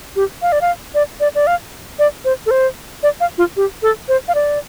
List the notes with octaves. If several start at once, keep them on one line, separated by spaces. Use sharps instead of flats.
G4
F5
D5
F5
D5
D5
D5
F5
D5
C5
A4
C5
D5
F5
F4
G4
A4
C5
F5
D5